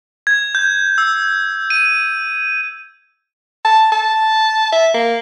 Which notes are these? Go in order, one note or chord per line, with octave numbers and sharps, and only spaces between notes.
G#6
G6
E6
D#7
A5
A5
E5
A#3